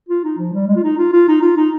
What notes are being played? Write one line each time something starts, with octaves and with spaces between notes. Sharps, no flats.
F4
D#4
F3
G3
G#3
F4
D#4
F4
F4
D#4
F4
D#4